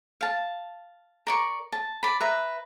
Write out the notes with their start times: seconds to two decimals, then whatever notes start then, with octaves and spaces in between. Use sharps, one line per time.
0.21 F5 A5
1.27 A#4 D5 C#6
1.72 A5
2.03 D5 B5
2.20 B4 E5 A#5